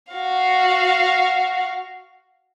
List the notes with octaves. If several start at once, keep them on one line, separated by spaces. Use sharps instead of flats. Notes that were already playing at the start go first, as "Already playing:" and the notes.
F#4 F5